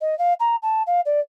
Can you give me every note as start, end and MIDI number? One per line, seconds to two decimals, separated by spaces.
0.01 0.17 75
0.19 0.33 77
0.40 0.56 82
0.62 0.83 81
0.87 1.01 77
1.06 1.20 74